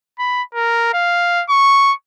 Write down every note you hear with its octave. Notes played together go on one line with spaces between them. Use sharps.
B5
A#4
F5
C#6